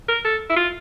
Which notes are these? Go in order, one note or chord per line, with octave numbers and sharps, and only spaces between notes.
A#4
A4
E4
F4